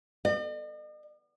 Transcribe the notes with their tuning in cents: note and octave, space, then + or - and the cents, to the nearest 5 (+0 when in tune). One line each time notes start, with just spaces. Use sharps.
D#5 -45